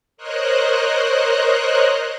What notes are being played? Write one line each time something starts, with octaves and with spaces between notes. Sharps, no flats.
A#4 C5 C#5 D#5 F#6